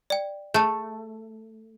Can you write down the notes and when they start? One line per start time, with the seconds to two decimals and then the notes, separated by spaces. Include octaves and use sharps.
0.10 D5 G5
0.54 A3 G#4 A5